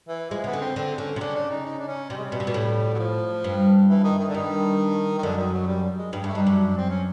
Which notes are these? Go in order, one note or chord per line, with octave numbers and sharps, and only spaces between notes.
E3
F3 G#3
C#3 B3
D3
C4
D3 C4
D3 C#4
C3
C#3 D4
D4
D#4
D#4
D4
C#4
C3 G3
G#3
G3
B2
C3
B2
A2
F#3
F3
G2
E3
D#3
D#3
D3
G2 D#3
D#3
F#2 D3
D#3
F#3
G3
G#3
G2 G#3
G2
A3
G2 D#4
F#2 D4
C4
C#4